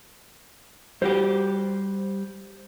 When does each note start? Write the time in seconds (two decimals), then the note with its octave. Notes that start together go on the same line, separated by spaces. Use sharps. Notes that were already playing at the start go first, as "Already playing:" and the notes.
1.02 G3 F#4 G4 C5